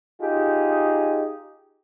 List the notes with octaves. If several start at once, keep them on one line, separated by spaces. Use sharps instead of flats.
D#4 F4 G4 G#4